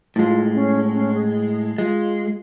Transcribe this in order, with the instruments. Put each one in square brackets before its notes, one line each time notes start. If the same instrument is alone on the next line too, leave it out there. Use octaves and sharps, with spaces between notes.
[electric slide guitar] A2 G#3 [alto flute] F4
[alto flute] C#4
C#4
G#4
[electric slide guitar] G#3 [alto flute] F4